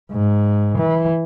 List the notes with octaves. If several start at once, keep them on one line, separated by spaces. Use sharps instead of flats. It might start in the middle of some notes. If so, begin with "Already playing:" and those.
G#2
E3